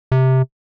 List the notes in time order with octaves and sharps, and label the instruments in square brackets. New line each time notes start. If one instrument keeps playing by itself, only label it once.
[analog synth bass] C3